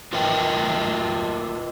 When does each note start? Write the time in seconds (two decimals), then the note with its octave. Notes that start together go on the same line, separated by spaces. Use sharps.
0.13 F4 A#4 B4 D#5 G5